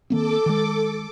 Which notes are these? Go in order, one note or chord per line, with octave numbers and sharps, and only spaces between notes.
D#3 A#3 C4 A4 D6
D#3 G#3